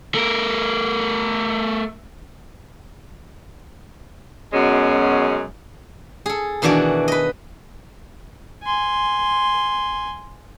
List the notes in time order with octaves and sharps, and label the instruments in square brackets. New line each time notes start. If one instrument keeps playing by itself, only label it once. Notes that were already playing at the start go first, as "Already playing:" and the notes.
[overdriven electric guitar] A3 A#4
[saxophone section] F#2 B2 G#3 C#4
[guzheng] G#4 A4
B2 D#3 E3 D4 F#4
B4 D#5
[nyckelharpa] G#5 C6